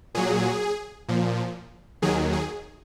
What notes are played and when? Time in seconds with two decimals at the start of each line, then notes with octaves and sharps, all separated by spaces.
0.15 A#2 F#3 G#4
1.09 A#2 F3
2.02 D#2 D#3 F#3 G#4
2.33 G#4